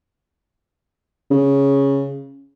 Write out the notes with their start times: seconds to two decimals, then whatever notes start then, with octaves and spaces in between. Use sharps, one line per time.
1.31 C#3